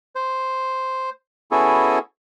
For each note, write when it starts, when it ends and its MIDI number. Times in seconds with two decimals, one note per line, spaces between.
0.15 1.10 72
1.51 1.99 59
1.51 1.99 61
1.51 1.99 64
1.51 1.99 66
1.51 1.99 68
1.51 1.99 69